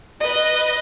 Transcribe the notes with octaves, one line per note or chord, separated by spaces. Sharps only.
B4 D#5